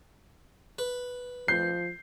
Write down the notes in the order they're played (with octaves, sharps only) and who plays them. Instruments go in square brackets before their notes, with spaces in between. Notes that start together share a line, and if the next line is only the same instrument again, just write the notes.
[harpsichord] B4
[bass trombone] F3 [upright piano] G6 [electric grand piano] C7